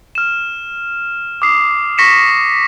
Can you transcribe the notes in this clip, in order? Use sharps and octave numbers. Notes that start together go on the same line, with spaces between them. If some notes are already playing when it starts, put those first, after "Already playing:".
F6 E7
D6 D#6 C7
C#6 A#6 B6 C#7 E7